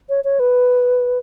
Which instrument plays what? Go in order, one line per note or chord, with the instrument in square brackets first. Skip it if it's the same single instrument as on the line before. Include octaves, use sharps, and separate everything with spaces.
[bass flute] C#5
C#5
B4